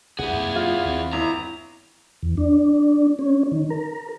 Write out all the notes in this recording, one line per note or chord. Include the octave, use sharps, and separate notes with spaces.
C2 E4 G#4 F#5
F#2 C3 A#3
F4
D#2 C4
G1 E4 A#5
E2
D4
C#4
D#3
A#4